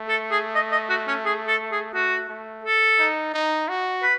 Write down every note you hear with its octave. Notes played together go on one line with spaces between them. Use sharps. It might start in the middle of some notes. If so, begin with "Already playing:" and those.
Already playing: A3
A4
G#4
D#5
D#5
F#4
C#4
G#4
A4
G#4
A3 F#4
A3
A4
D#4
D#4
F#4
B4